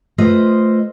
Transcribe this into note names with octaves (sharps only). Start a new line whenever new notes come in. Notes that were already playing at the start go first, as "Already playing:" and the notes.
A3 F4 B4 C5 D#5